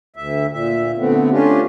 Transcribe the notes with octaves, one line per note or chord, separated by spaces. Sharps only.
D2 E5
A#2 E5
D3 A3 B3 C4
A3 C#4 D4 F4 G4